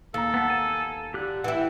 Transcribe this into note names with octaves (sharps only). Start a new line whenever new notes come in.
D#2 A4 F5 A#5
B3 A5
G#5 A5
D3 G4 F#6
E3 E4 F#5 G5